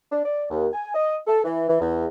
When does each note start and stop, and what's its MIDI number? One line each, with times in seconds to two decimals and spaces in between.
0.12 0.23 62
0.25 0.45 74
0.50 0.67 39
0.73 0.91 80
0.94 1.17 75
1.26 1.39 69
1.44 1.64 52
1.68 1.77 52
1.81 2.06 40